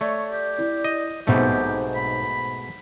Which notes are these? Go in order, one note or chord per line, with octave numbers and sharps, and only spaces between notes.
A3 C#5 D5
G4
E4
D#5
B1 G#2 B2 A3 C4 G4 C5
B5